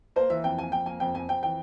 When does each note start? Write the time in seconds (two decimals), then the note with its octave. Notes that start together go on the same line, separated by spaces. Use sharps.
0.16 A#3 C5
0.30 E3 E5
0.44 F2 G5
0.58 A#3 G#5
0.72 F2 G5
0.86 A#3 G#5
1.00 F2 G5
1.14 F2 G#5
1.29 F2 G5
1.43 E3 G5